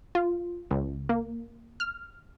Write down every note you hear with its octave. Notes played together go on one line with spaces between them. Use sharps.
F4
C#2
A#3
F6